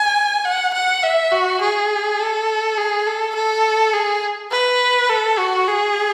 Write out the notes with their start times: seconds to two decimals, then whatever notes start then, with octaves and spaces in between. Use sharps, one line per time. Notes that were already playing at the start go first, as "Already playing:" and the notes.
Already playing: G#5
0.45 F#5
0.74 F#5
1.03 E5
1.32 F#4
1.61 G#4
2.20 A4
2.77 G#4
3.07 A4
3.35 A4
3.93 G#4
4.52 B4
5.10 A4
5.39 F#4
5.68 G#4